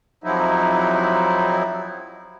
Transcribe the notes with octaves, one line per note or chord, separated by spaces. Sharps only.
F2 C3 F3 F#3 D#4 E4